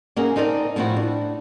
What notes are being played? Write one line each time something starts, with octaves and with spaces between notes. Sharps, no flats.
A#3 C#4 D#4 F#4 G#4 A#4
C4 D#4 A4 A#4 D5
A2 F3 C4 E4 F#4
D4